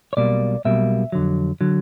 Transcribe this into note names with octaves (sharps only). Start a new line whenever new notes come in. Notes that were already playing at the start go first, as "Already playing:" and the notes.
C#5
B1 B2 G3 A#3 D5
B1 B2 G3 A#3 E5
F2 D3 F#3
D3 F#3